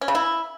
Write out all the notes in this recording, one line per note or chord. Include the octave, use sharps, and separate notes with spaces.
C#4
C#3
E4